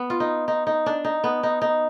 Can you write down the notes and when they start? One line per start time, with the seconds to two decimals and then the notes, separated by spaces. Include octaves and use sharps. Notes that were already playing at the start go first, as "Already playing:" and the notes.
Already playing: B3
0.10 F4
0.20 D#4
0.48 D#4
0.67 D#4
0.86 D4
1.05 D#4
1.24 B3
1.43 D#4
1.62 D#4